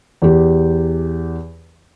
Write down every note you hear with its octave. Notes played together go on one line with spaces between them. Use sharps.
E2 G4